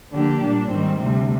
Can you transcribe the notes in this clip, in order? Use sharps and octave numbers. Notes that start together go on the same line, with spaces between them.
D3 F3 A#3 D4 G4
A#2 G3 D4
G#2 D#3 G3 C4
D2 C3 G3